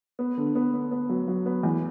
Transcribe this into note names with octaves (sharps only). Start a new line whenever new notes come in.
B3
D3
B3
B3
B3
F#3
F#3
B3
E2